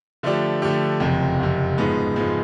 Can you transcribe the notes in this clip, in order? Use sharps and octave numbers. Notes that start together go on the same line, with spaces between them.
D3 F3 A3 D4 G4
D3 F3 A3 D4 G4
F#1 F2 C3
F#1 F2 C3
G#2 F3 G#3 B3
G#2 F3 G#3 B3